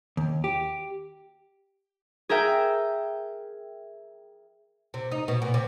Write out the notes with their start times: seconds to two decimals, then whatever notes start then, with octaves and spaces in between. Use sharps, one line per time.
0.17 D#2
0.44 G4
2.29 G#4 A#4 E5 G5
4.94 C3
5.11 D#4
5.28 B2
5.42 A#2
5.54 C3